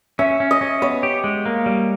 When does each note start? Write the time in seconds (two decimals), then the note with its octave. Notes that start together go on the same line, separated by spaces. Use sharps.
0.19 C#4 E5
0.40 C#4
0.51 D#5
0.61 C#4
0.82 B3 C#5
1.03 G4
1.24 G#3
1.46 A#3
1.66 G3